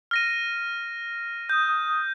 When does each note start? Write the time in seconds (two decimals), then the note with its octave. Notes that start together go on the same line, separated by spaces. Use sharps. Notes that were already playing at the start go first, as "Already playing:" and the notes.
0.11 F6 A#6 D#7
1.49 D#6 G6